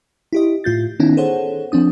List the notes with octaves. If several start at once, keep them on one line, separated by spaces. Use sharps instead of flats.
E4 G4 D#5
A2 F4 G6 A6
D#3 B3 C#4 D#4 E4
G#4 A4 C5 C#5 F#5
F3 C4 D4 D#6